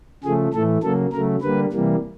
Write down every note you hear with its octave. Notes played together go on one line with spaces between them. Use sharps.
C#3 F3 A3 G#4
A2 E3 A3 A4
C#3 F#3 A#3 A4
C#3 F#3 A3 A#4
D3 G3 A#3 B4
C3 E3 G3 A#3